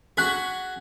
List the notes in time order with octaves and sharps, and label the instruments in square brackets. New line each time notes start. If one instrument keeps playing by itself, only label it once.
[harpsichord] F#4 G#4 [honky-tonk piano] F#6 B6